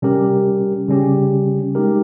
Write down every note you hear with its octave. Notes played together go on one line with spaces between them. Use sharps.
C3 G3 C#4 G4 A#4
C#3 G3 C#4 G4
G#3 D#4 G4 A#4